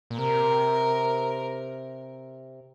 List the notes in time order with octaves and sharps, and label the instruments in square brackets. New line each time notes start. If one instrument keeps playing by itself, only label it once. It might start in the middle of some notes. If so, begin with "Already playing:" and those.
[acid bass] A#2
[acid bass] C3 [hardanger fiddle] A#4